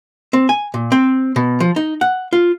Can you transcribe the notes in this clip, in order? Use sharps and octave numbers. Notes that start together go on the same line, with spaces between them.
C4
G#5
A#2
C4
B2
F3
D#4
F#5
F4